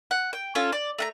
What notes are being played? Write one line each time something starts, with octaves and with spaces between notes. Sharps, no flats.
F#5
G5
C#4 F4 A4 C#5
D5
A3 F#5 A#5